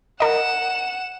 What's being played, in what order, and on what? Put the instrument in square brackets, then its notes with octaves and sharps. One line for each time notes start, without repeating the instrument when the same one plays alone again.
[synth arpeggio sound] A#4 D#5 [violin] F#5 E7